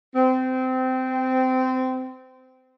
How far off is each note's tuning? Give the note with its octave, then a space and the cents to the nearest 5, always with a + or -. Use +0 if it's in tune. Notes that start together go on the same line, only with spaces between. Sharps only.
C4 -20